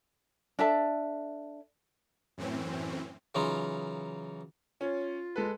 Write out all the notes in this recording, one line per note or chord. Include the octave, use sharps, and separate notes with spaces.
D4 A4 E5 A5
F#2 A2 E3 C4 C#4
C#3 E3 F#3 D#4 F4
C#4 F4 C#5
G#3 A4 B4